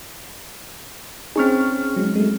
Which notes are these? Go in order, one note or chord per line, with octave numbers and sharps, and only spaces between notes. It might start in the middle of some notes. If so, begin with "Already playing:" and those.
C4 C#4 D#4 G#4 C#6 F6
F#3 G#3
G#3 A3